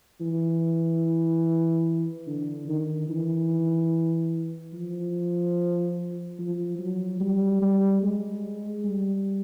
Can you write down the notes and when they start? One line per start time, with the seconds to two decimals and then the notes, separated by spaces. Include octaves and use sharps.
0.21 E3
2.27 D3
2.68 D#3
3.09 E3
4.73 F3
6.39 F3
6.79 F#3
7.20 G3
7.62 G3
8.02 G#3
8.85 G3